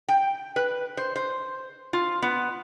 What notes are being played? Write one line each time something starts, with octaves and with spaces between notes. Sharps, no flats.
G5
B4
C5
C5
F4
B3